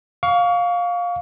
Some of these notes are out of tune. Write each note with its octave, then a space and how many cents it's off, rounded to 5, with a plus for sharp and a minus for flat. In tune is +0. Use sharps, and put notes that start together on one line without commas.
F5 +15 C#6 +35